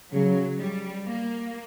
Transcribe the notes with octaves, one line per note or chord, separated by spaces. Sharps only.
C#3 F#3
G3
A#3